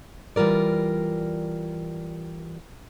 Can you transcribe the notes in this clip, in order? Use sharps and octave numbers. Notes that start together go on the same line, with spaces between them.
E3 G3 F4 A#4 D5